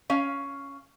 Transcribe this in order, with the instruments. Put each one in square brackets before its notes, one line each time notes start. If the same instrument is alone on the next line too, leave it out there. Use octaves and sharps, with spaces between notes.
[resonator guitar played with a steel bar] C#4 F5